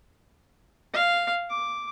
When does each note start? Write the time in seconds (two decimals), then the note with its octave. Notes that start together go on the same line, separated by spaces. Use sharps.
0.93 F5
1.50 D6